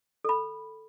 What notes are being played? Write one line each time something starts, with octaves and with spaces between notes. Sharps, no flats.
A4 B5